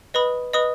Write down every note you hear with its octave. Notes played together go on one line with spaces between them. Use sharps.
B4 D#5 B5 D#6
B4 D#5 B5 D#6